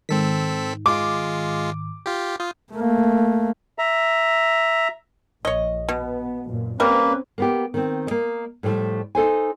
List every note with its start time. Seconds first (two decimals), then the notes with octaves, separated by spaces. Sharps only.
0.09 G#2 D#3 C4 A4 B6
0.86 G#3 F4 D6
2.06 F4 G4
2.40 F4 D#6 G6
2.72 A3 A#3
3.78 E5 A#5
5.45 A#1 C#5 D#5
5.89 B2 B3
6.47 F#2 A#2
6.80 G3 A#3 C4 C#4 A#4 B4
7.38 A#3 B3 G4
7.74 D#3 C4
8.07 A#3 D#5
8.63 A2 F3 G3 A3
9.15 D#4 A4 C5 G#5